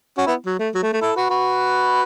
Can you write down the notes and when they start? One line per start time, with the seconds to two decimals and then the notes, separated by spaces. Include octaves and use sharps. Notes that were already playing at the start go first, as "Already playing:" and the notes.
0.18 C#4 F#4
0.26 B3 E4
0.46 F#3
0.59 A3
0.74 F#3
0.83 A3
0.93 A3
1.02 E4 A4
1.16 F#4 B4
1.30 F#4 B4